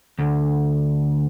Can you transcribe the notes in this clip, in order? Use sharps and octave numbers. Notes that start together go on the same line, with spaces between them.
D2